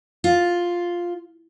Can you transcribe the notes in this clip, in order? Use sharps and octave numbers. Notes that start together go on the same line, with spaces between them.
F4